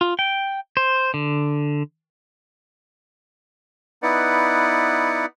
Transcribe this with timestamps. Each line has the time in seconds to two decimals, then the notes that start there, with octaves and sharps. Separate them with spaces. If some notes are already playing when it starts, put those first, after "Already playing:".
0.01 F4
0.19 G5
0.77 C5
1.14 D3
4.03 B3 D#4 E4 B4 D5 F#5